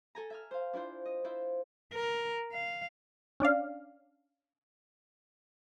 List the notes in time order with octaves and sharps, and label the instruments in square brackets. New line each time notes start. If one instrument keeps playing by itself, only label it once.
[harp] A4 G#5 A#5
E5 G#5 F6
C5 F5
D4 E4 F4 C5
D#5
E4 F4 C5 E5
[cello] A#4
F5
[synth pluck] C#4 D4 D5 F5